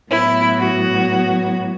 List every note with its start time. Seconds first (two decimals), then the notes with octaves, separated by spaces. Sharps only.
0.11 A2 F#3 B3 E4
0.59 F#4